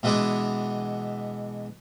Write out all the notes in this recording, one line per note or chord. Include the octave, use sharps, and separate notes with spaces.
B2 E3 G#3 B3 D4 E4